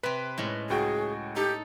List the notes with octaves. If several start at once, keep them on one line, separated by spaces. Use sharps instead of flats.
C3 C4 B4
A2 G#3 C#4
C#2 F#4 G#4 G5
D#4 G4 A4